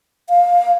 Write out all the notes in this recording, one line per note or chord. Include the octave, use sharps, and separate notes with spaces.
F5